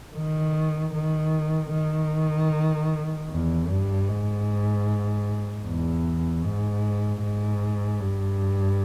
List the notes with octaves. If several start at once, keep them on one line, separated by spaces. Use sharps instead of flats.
D#3
D#3
D#3
E2
G2
G#2
E2
G#2
G#2
G2